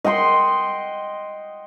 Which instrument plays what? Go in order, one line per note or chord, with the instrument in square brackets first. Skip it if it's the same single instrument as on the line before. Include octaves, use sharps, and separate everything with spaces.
[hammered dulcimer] D#5 F#5 G5 C6